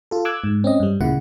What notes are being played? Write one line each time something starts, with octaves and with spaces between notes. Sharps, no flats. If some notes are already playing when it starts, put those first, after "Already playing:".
F4 A4
D6 E6 F#6 G#6
G#2
C4 C#4 D#5
G2 G3
D2 A#2 C#3 E4 F#5